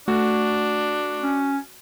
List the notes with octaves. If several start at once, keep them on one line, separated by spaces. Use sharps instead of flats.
A3 D4 F#4
C#4